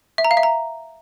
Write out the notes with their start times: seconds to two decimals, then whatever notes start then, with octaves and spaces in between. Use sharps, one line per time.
0.18 E5
0.24 A#5
0.31 F5
0.37 E5
0.43 A#5